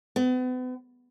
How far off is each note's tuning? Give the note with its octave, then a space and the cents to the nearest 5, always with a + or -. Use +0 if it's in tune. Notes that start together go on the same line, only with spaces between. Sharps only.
B3 +40